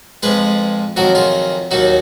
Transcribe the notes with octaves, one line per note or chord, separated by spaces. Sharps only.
F2 F3 G#3 G#4 B4
F2 D#3 F#3 F#4 A#4
F4 G#4
D#2 D#3 F#3 D#4 F#4